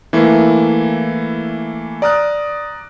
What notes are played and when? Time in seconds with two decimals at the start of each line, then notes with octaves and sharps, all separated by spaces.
0.13 E3 A3 A#3 E4
2.02 D5 A#5 D#6 F6 F#6